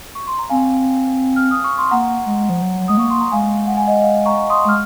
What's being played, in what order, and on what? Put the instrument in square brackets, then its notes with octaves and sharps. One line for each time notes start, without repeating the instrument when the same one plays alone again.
[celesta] C#6
C6
A#5
[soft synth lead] C4 [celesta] F5 G#5
[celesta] F6
D#6
C#6
C6
[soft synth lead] A#3 [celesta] F#5 A#5
[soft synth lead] G#3
F3
F#3
[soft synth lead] G#3 [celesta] D#6
[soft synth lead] A#3 [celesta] C#6
[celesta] C6
A#5
[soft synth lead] G#3 [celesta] F5 G#5
[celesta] F#5
G#5
D#5 F#5
F5
A#5 C#6
C6 D#6
[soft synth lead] G#3
[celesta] F6